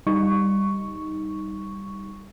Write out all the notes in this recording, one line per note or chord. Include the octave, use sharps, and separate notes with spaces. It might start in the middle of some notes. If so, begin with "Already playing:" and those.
G3 D#4 C#6